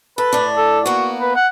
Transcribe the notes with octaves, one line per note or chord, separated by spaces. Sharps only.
A4 B4
A2 D4
A4
A#3 B3 F#4
B4
F#5